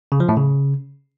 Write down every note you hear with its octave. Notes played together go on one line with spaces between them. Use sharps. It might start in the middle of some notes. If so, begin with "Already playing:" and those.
C#3
F3
A2
C#3